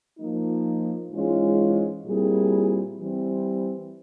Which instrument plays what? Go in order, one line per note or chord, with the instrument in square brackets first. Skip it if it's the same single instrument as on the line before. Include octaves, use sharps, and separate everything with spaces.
[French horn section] F3 A#3 D#4
G#2 E3 G#3 C#4 F4
A#2 G3 C4 E4 G#4
E3 G3 C4